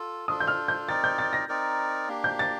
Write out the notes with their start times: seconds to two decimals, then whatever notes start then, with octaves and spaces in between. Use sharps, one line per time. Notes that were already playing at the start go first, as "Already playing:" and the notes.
Already playing: F4 A4
0.28 D4 F4 A4 D#6
0.40 G6
0.47 F6
0.68 G6
0.89 C4 D#4 A#4 D5 A6
1.04 G6
1.19 A6
1.33 A#6
1.49 C4 D#4 A#4 D5
2.08 A#3 D4 G4
2.24 G6
2.39 A6